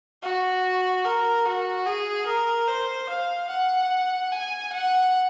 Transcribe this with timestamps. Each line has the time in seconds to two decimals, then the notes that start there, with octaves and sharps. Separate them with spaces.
0.23 F#4
1.05 A#4
1.46 F#4
1.86 G#4
2.27 A#4
2.67 C5
3.09 F5
3.50 F#5
4.32 G#5
4.73 F#5